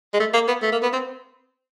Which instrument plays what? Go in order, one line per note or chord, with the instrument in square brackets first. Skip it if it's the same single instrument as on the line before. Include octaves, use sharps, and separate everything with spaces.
[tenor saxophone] G#3
A3
A#3
B3
A3
A#3
B3
C4